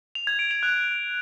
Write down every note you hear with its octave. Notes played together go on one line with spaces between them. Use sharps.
F7
G#6
D7
F7
F#6